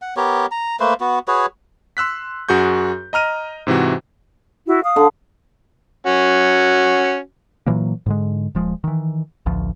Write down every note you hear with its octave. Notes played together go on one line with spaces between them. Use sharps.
F#5
B3 G4 A#4 C#5
A#5
A3 A#3 B4 C5
B3 F#4
F#4 G#4 B4 C#5
C6 E6 F#6 B6
F#2 F#4 G#4 C#6 G6
D#5 A#5 F6 D#7
G#2 C3 E3 F#4
E4 F#4
F5 D#6
D3
C#4 F#4
A#2 E3 F#3 A#3
G#2 D3 G#3
D#1 F3 G#3
D#3 E3
A1 D2 F3